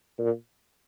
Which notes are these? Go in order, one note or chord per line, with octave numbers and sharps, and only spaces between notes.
A#2